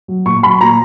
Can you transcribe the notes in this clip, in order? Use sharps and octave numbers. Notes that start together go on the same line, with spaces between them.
F#3
A#2 C#6
F#3 B5
A#2 A#5